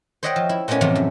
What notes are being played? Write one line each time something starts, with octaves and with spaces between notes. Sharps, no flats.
C5 C#5 D#5 E5 F#5 G5
F3
E4
A#2 G#3 A3 B3 C#4 G#5
A2 C3 E3 F3 A3
F#2